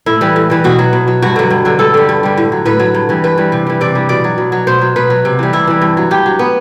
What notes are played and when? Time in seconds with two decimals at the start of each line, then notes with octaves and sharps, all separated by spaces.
0.06 A2 E4
0.21 E3 G3
0.36 A2
0.50 E3 G3
0.64 B2 F#4
0.79 F#3
0.93 B2
1.08 F#3
1.22 G2 F#4
1.36 D3 F#3
1.50 G2
1.65 D3 F#3
1.79 G2 A4
1.94 D3 G3
2.09 G2
2.23 D3 G3
2.38 A2
2.52 F#3
2.65 A2 B4
2.80 F#3
2.94 G2
3.09 E3 G3
3.24 G2 B4
3.37 E3 G3
3.52 C3
3.66 E3 G3
3.81 C3 D5
3.95 E3 G3
4.09 B2 D5
4.24 F#3
4.38 B2
4.52 F#3
4.67 B2 C5
4.81 F#3
4.96 B2 B4
5.10 F#3
5.25 C3
5.39 E3 G3
5.53 C3 E4
5.67 E3 G3
5.81 G2
5.97 F#3
6.11 G2 G4
6.26 F#3
6.39 B3